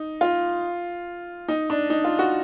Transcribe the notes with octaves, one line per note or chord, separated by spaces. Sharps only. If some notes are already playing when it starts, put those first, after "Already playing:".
Already playing: D#4
F4
D#4
D4
D#4
F4
F#4